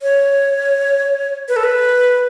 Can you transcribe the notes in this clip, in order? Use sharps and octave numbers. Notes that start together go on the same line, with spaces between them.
C#5
B4
A4
B4